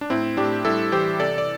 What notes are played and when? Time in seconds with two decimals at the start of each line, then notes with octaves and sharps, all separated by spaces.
0.01 D4
0.10 A2 C4 E4
0.37 A2 D4 G4
0.65 G3 E4 A4
0.92 E3 G4 C5
1.20 C3 A4 D5
1.38 D5